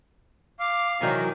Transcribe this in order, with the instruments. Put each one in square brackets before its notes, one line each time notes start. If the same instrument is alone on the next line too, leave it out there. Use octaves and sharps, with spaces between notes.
[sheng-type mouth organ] F5 [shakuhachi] D6
[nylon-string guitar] C3 E3 F#3 [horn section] D#3 [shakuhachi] G5